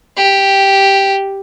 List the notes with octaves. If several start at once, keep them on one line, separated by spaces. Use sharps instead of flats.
G4